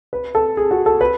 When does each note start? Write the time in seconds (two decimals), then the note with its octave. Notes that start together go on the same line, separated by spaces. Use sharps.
0.13 B4
0.35 A4
0.57 G#4
0.71 F#4
0.86 A4
1.01 B4